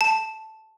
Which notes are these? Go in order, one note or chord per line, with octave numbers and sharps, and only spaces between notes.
A5